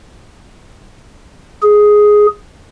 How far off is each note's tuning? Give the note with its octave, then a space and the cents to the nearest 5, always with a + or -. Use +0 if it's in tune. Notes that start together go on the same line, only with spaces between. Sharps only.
G#4 +5